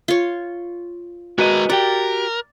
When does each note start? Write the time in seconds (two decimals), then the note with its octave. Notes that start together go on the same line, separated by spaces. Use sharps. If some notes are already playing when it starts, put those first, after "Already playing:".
0.08 F4 C#5
1.39 G#3 F#4 A#4 B4 D#5
1.70 F#4 G4 A#4 D5 G5